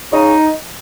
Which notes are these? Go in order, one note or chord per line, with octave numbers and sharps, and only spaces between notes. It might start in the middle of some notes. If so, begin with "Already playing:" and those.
C#3 D#4